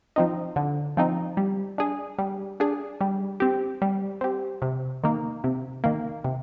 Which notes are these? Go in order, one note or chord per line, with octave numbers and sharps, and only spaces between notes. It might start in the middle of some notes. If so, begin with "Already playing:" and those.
F3 C4 D#4
D3
F3 C4 D#4
G3
D4 G#4
G3
D4 G#4
G3
C4 G4
G3
C4 G4
C3
D#3 A#3
C3
D#3 A#3
C3